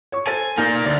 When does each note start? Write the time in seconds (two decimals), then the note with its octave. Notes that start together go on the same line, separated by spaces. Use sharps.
0.12 C#5 C#6
0.27 A4 C5 G#5 A6
0.57 A#3 D#4 A#4 D5 G6
0.85 D2 D5